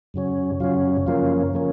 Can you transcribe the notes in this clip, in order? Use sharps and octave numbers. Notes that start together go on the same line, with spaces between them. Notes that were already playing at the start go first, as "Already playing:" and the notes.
F#2 C#3 F#3 C#4
F#2 C#3 F#3 C#4 F4
F#2 C#3 F3 A#3 C#4 F4
C#3 F3 A#3 C#4